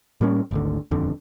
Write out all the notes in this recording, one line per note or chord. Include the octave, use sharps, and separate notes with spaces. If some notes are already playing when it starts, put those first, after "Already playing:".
A2 G3 A#3 C#4
G#1 D2 D3
D#1 F2 D3